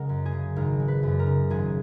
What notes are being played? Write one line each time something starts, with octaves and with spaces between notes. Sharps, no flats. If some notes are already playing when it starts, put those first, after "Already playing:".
Already playing: C#3 G#3 A#4 F#5
F#2
G#4
C#3
G#1 A#4
G#3
B4
F#2
A#4
C#3
G#1 G#4